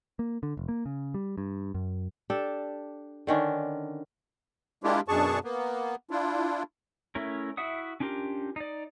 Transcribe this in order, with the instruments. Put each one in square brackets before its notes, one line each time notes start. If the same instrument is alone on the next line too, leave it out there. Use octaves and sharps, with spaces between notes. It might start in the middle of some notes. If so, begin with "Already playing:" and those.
[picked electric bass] A#3
D3
F1
A#3
C#3
G3
G2
F#2
[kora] D4 G4 A4
D3 D#3 C#4 D4
[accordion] G#3 A#3 D4 E4 F4 G4
F#2 B2 D4 G#4 A5 C#6
A#3 B3
D4 E4 F4
[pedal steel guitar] A3 C#4 E4 A#4
E4 F#4 E5 F#5 D#6
C#4 D4 F4 G4 A#4
D#4 D5